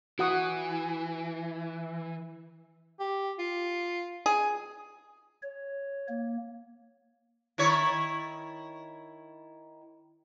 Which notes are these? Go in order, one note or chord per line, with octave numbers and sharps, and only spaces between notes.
E3 F#4 F#5 D#6
G4
F4
G#4
C#5
A#3
D#3 E4 C#5